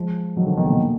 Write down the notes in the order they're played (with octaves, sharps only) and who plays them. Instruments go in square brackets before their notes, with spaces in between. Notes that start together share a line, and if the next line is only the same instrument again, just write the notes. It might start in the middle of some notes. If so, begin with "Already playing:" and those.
Already playing: [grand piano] F3 G#3
D#3 F#3
D3 F3
B2 D#3
A#2 D3